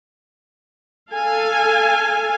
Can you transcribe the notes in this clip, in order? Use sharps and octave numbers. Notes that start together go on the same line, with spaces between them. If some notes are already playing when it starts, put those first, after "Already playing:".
A4 F5 G#5